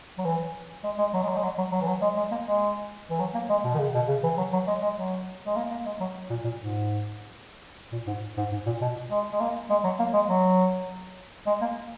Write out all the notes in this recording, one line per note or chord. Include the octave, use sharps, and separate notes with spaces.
F#3
E3
G#3
G#3
F#3
G#3
F#3
G#3
F#3
F#3
F#3
E3
F#3
G#3
G#3
A#3
G#3
E3
F#3
A#3
G#3
B2
D#3
C#3
B2
C#3
E3
F#3
F#3
G#3
G#3
F#3
G#3
A#3
A#3
G#3
F#3
A#2
A#2
G#2
A#2
G#2
G#2
G#2
A#2
B2
G#3
G#3
A#3
G#3
F#3
A#3
G#3
F#3
G#3
A#3